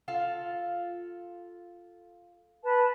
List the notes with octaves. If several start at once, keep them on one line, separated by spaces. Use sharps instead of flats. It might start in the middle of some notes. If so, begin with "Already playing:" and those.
F4 A4 F5
B4 A5